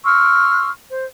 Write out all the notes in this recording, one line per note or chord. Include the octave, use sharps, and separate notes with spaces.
C6 C#6 E6 F6
C5